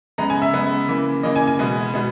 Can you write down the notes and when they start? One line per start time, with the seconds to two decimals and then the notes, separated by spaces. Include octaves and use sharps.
0.18 C#3 G#3 B3 A#5
0.30 G#5
0.42 E5
0.53 C#3 G#3 B3
0.88 C#3 E3 A#3
1.23 C#3 E3 A#3 D#5
1.36 G#5
1.47 G#5
1.59 B2 G#3 B3
1.94 B2 G#3 B3